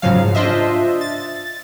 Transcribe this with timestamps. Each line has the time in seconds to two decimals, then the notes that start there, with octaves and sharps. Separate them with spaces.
0.02 G#2 C#3 F3 F#3 F5
0.35 D4 F4 C5 D#5 E5
1.01 A6